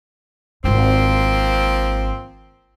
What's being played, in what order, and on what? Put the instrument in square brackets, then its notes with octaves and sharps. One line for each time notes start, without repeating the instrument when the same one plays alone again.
[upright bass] D1 G#1 [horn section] F3 A#3 C4